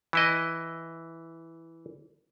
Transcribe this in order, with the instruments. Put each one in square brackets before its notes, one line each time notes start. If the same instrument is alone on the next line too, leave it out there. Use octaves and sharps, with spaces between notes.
[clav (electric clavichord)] E3 E4 D#5